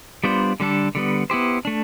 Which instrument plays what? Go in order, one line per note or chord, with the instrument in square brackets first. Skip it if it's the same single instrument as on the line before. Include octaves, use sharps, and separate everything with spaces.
[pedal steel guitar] G3 B3 D4 F4 C5
D3 G3 D4 A4
D3 G3 B3
B3 E4 G4 C5
A3 D4